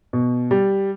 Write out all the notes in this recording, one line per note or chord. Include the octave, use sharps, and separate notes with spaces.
B2
G3